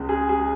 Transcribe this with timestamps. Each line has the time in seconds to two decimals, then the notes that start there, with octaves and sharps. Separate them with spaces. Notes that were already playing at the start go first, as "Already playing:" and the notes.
Already playing: C#2 C#3 G#3
0.09 G#4
0.29 G#4